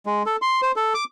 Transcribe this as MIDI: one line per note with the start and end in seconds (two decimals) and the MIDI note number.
0.06 0.23 56
0.26 0.36 69
0.42 0.61 84
0.62 0.72 72
0.76 0.93 69
0.94 1.04 86